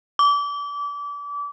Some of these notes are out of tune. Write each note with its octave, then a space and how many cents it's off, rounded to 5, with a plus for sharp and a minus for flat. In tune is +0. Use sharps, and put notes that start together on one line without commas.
D6 -30